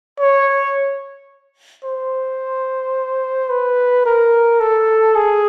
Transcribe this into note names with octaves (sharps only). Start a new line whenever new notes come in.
C#5
C5
B4
A#4
A4
G#4